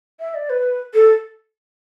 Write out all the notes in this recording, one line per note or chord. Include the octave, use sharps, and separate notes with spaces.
E5
D5
B4
A4